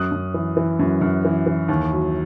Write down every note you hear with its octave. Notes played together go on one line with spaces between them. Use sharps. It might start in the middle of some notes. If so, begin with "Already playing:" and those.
Already playing: F#2 D#6 F#6
F#2
E3
E3
F#2
F#2
E3
E3
D#2
F#3